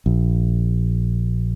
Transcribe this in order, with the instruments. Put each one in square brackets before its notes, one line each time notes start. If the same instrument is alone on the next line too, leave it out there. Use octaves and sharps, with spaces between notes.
[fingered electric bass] A#1